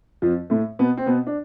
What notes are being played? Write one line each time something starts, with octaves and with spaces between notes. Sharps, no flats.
F2 F3
A2 A3
B2 B3
C4
B2 B3
D4